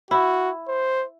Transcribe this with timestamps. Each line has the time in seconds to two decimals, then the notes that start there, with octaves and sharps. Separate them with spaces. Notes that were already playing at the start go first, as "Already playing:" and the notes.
0.11 E4 F#4
0.68 C5